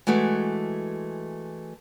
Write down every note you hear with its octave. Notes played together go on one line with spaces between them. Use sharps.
E3 G#3 A3 F#4